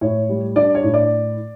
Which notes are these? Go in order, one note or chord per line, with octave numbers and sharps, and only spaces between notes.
A2 C#5
G3
D4 D5
C#5
A2
D5